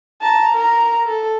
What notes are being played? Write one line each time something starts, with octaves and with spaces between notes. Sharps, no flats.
A5 A#5
A#4 A#5
A4